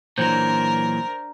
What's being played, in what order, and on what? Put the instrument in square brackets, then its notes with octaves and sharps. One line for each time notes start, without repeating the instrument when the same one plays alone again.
[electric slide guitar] A#2 E3 F#3 [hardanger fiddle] D4 A#4 [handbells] C5